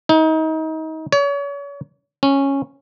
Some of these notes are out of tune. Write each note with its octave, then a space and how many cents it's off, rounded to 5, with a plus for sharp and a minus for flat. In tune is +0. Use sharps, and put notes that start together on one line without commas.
D#4 +30
C#5 +35
C#4 -10